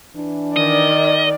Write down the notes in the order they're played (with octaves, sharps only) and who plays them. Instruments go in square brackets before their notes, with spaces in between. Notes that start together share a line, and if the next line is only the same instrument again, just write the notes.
[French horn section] E3 D4
[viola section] D#3 [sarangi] D5 [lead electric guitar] D#5